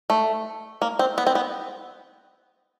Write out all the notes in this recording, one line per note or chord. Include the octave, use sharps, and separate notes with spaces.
A3
A#3
C4
B3
C4
B3